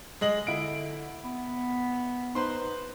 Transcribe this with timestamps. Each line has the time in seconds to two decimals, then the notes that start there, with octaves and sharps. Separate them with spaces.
0.21 G#3 D#5 F#7
0.47 D3 E4 D7
1.24 B3
2.35 D#4 B4 C5 C6